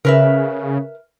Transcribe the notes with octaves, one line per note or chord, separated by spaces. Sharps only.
C#3 A#4 B4 E5